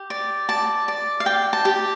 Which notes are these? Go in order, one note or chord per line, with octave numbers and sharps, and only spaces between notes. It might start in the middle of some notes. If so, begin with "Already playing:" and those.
Already playing: G4
D5
D5 A5
D5
F5
D5 G5
A5
G4